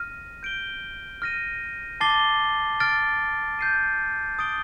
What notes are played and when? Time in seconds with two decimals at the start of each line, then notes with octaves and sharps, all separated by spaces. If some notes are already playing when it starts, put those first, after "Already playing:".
Already playing: F6 A#6 D#7
0.43 G6 D7 G7
1.22 F6 A#6 D#7
2.01 A5 D6 A6 C7 G7
2.80 F6 A6 D7
3.59 G6 C7 D#7
4.39 D#6 A6 D7 G7